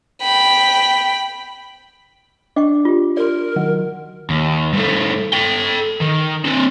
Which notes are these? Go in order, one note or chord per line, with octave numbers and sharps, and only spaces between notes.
G5 B5
D4 D#5 G5 C#6
F4 G4
A#4 D5 C6
D#3 F#3
D#2
G2 A3
A4 G5
D#3
C4 D4